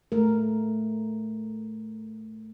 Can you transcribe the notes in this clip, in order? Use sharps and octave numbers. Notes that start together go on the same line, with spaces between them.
A3 A#4